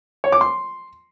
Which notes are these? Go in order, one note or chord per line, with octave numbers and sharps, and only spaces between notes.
C#5
D6
C6